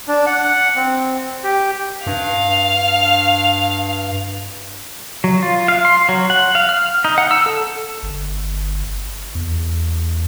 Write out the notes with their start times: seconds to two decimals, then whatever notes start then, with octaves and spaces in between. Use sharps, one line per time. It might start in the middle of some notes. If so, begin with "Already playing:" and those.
0.08 D4
0.27 F#5
0.76 C4
1.44 G4
2.06 G2 F5
5.24 F#3
5.43 F4
5.68 F5
5.85 C6
6.09 F#3
6.30 F#5
6.55 F5
6.69 F6
7.05 D#4
7.18 F#5
7.31 E6
7.46 A4
8.03 G1
9.35 E2